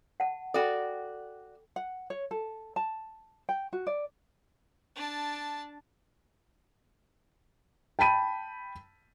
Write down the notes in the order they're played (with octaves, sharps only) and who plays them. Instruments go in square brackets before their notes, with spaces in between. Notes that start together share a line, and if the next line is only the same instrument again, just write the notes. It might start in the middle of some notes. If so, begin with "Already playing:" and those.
[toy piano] F#5 A5
[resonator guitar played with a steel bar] F#4 D5 [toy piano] A4 G5 B5
[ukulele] F#5
C#5
A4
A5
G5
F#4
D5
[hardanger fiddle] D4 A5
[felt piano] G5 A5 B5 D#7